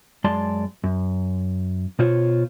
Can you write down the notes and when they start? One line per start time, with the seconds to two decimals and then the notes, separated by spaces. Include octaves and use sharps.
0.24 F#2 G#3 D5 A5 C6
0.84 F#2
1.99 B2 F4 C5 C#5